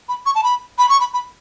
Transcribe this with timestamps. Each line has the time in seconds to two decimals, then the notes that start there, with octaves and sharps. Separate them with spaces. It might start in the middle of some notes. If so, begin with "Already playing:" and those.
0.09 B5
0.26 C#6
0.35 A5
0.44 B5
0.78 B5
0.89 C#6
1.00 B5
1.13 B5